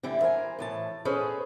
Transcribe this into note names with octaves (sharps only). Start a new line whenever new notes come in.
D3 E3 G3 E4
A#4 C5 F#5 G#5
A2 E3 A5
C#4 G#4 A4 B4 C5 D#5